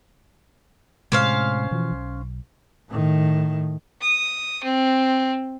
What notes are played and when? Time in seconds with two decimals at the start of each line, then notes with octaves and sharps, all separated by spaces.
1.12 A2 C3 G#3 C#4 C5 F5
1.71 B2 E3 F3
1.91 B1
2.90 A2 D#3
4.01 D#6
4.64 C4